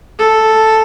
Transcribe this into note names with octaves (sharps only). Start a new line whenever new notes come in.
A4